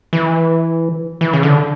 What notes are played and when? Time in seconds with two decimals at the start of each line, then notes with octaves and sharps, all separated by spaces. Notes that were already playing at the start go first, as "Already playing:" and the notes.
0.13 E3
1.21 E3
1.33 C#3
1.43 D3